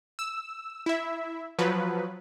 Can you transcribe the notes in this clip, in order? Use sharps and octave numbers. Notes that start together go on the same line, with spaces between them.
E6
E4 E5
F3 F#3 B4